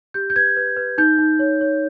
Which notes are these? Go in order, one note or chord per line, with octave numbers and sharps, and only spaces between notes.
G4 G6
G6
B4 G#6
B4
B4
D#4 G6
D#4
C#5
C#5